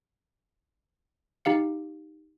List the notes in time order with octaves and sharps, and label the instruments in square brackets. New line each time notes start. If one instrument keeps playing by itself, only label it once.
[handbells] D#4 G4 F5 C#7